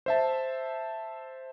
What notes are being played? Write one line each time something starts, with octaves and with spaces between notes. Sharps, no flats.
C5 E5 A5